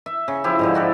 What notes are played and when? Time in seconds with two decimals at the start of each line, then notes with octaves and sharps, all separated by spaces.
0.06 E5
0.28 C#3
0.44 F3 E4 G4
0.59 G#2 D3 F3
0.74 E4 F#4 G4 A4